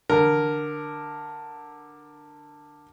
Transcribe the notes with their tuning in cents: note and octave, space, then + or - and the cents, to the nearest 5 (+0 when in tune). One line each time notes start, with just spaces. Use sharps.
D3 +10 A#4 +0